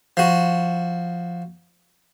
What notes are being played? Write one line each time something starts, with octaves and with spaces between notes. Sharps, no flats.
F3 F#4